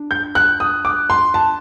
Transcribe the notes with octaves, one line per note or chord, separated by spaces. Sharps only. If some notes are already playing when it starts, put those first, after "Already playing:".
Already playing: D4
G6
F#6
D#6
D6
C6
A5